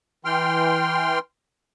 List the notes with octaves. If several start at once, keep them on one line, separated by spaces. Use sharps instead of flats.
E3 G5 C6 F6